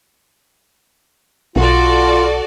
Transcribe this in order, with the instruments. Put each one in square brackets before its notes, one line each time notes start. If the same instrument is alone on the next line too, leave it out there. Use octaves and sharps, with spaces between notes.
[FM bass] B1 [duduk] F4 [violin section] F#4 A4 D5